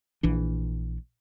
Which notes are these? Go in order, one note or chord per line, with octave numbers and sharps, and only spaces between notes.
A#1 E3 D4